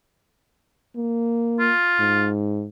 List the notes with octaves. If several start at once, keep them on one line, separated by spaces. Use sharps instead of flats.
A#3
F4
G#2